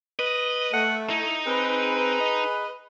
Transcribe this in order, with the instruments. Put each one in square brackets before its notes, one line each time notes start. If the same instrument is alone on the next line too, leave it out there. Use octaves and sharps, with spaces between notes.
[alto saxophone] B4 [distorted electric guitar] D#5
[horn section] A3 [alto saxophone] F#5
[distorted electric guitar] D#4 [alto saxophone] E4
[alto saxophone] C4 [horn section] G#4 B4
[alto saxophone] D#5